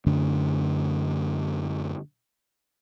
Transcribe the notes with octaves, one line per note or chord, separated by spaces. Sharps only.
F#2 D3 A3 D4